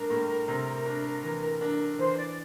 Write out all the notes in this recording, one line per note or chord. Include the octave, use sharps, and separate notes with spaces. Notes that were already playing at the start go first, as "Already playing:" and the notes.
Already playing: A2 G3 D4 A#4
A2
C3
D4
E3
D4
E3 C5
D5